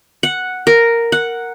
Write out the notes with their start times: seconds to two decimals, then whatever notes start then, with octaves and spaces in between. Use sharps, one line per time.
0.23 F#5
0.67 A#4
1.12 F#5